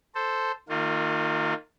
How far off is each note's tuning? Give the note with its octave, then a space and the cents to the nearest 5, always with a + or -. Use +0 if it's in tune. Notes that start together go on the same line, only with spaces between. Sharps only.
A4 +0 C5 +0
D#3 +0 A#3 -35 F4 +20